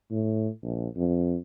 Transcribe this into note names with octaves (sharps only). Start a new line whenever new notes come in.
A2
A#1
F2